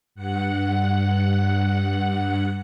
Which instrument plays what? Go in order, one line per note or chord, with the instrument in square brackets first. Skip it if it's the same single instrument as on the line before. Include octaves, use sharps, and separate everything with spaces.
[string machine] G2 F#5